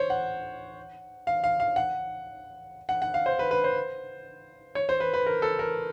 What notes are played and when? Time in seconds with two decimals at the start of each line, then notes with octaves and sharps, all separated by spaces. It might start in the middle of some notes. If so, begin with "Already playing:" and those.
Already playing: C5 C#5
0.10 F#5
1.27 F5
1.44 F5
1.60 F5
1.76 F#5
2.89 F#5
3.02 F#5
3.14 F5
3.26 C5
3.39 B4
3.51 B4
3.64 C5
4.75 C#5
4.89 C5
5.00 B4
5.14 B4
5.26 A#4
5.42 A4
5.59 A#4